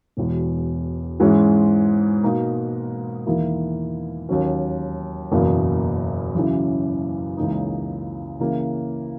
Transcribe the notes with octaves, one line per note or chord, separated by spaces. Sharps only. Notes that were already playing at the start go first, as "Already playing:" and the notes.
E1 E2 B2
G#2 E3 G#3 C#4
B2 A#3 D#4 A#4
E2 D#3 A#3 E4
D#2 D#3 F#3 C#4
F#1 E2 B2 A#3
F#2 C#3 E3
C#2 C#3 E3 A#3 D#4
C#3 E3 A#3